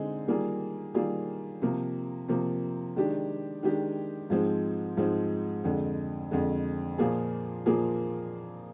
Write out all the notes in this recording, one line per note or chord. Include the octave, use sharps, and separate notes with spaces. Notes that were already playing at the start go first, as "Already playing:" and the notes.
Already playing: D3 G#3 C4 D#4 G#4
D#3 G3 A#3 F4 G#4
D#3 G3 A#3 F4 G#4
C3 F3 A#3
C3 F3 A#3
D#3 G#3 D4 G4
D#3 G#3 D4 G4
G#2 F3 G#3 C4
G#2 F3 G#3 C4
F2 D3 G#3
F2 D3 G#3
A#2 F3 A#3 F4 G#4
A#2 F3 A#3 F4 G#4